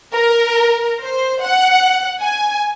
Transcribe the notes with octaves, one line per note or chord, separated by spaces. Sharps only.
A#4
C5
F#5
G#5